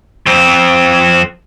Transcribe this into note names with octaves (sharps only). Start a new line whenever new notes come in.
F2 C4